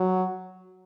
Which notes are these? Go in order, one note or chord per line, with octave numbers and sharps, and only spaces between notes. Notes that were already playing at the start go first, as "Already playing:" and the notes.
Already playing: F#3